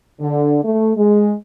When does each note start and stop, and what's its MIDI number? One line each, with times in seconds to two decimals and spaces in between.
0.20 0.59 50
0.63 0.91 57
0.97 1.33 56